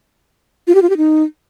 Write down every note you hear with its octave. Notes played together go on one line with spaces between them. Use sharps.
F4
G4
F4
G4
D#4